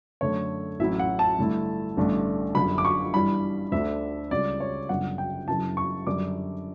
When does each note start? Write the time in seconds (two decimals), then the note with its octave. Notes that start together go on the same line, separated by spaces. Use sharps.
0.21 F#2 D3 A3 C#5
0.79 A1 A2 F#3 C#4 E4 E5
0.99 F#5
1.19 A5
1.39 G2 D3 A3 E4
1.97 A1 G2 D3 A3 D4
2.55 G1 F#2 D3 G3 B5
2.78 D6
2.85 C#6
3.14 G2 E3 G3 B5
3.72 D2 D3 A3 D4 E5
4.31 C#2 C#3 G3 D5
4.60 C#5
4.89 G1 F#2 C#3 F#5
5.18 G5
5.48 F#2 C#3 E3 A5
5.77 C#6
6.07 F#2 D3 G3 D4 D6